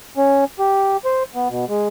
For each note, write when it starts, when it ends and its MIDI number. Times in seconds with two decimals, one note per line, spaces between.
0.17 0.44 61
0.59 0.97 67
1.05 1.23 72
1.35 1.48 59
1.49 1.65 47
1.69 1.88 56